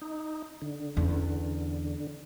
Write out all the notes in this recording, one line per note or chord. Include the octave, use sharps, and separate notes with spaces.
D#4
D3
E2 C#4